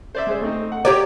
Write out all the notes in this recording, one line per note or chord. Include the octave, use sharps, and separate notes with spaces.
C5 D5 E5
G#3 G#4 C5
A3 C4 D#4
F#5
G4 C#5 D5 A#5